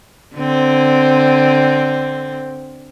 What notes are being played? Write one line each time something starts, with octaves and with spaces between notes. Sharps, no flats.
D3 C4